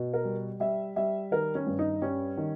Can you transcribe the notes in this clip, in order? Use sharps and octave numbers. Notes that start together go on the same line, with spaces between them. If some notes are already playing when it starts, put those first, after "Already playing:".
Already playing: B2
A#4
G3
G3 E5
G3 E5
D#3 A#4
C#4
G2
D#4
G3 C#4
D#3